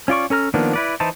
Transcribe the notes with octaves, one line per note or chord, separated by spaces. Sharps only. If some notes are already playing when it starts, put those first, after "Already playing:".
C#4 F4 D5 C#6
C#4 A4 A#5 F6
D#3 F3 A#3 B3 D4
E4 B4 D5
E3 D#4 E4 C5 A5